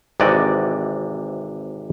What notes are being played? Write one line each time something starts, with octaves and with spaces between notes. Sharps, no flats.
G#1 C3 E3 F#4 D5 D#5